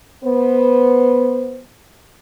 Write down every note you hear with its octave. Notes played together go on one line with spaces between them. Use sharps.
B3 C5